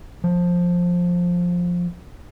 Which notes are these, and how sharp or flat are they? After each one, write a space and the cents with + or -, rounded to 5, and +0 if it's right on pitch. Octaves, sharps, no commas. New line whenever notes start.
F3 +10